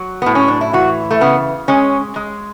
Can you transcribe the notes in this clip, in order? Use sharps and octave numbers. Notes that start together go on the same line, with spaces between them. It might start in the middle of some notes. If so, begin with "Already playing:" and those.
Already playing: F#3
A2 B3
C#4
D4
E4
E3 F#4
A3
C#3 B3
G#3 C#4
G#3